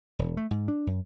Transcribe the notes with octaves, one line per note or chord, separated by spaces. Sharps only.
E1
A3
G#2
D4
F#2